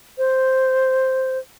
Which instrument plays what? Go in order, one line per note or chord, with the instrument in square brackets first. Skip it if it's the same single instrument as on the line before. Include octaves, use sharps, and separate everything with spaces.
[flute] C5